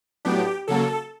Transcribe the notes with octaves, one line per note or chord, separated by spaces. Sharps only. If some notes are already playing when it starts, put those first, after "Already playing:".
A2 F#3 B3 D4 G4
C#3 F#3 A#3 A4